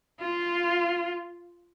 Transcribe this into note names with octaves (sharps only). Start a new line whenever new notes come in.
F4